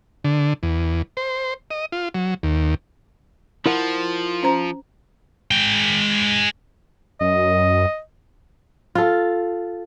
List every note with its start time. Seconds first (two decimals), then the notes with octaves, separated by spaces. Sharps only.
0.24 D3
0.63 E2
1.17 C5
1.71 D#5
1.92 F4
2.14 F#3
2.43 D#2
3.66 F3 E4 A#4 F#5
4.43 C#4 C5 A#5
5.51 G#3 G5
7.21 F#2 D#5
8.95 F4 A4